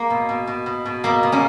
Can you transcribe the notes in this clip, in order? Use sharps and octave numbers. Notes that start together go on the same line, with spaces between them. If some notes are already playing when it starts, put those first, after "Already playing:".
Already playing: A#3
B2
B2
B2
B2
B2
B2 A#3
B2
A#3 C#4